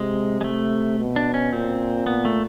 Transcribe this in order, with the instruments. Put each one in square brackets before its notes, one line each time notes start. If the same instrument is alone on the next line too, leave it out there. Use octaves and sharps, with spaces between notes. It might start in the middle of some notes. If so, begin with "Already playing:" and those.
Already playing: [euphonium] C3 [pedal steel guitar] G#3
[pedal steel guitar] G#3
A3
[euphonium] B2
[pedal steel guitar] D4
C#4
[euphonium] A#2 [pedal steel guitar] C4
[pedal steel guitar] B3
A3